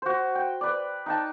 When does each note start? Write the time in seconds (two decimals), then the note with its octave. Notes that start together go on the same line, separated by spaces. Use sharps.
0.02 F#4 C5
0.35 G5
0.61 B4 D5
1.06 D#4 G5 A5